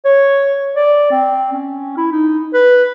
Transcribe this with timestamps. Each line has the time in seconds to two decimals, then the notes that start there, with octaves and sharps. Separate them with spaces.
0.05 C#5
0.76 D5
1.12 C4
1.53 C#4
1.97 E4
2.12 D#4
2.54 B4